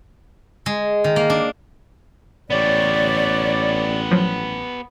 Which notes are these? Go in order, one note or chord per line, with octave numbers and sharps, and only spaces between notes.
G#3
D#3
A#3
D4
A1 B3 G4 C#5 D5
F3 F#3